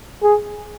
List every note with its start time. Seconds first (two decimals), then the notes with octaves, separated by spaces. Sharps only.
0.23 G#4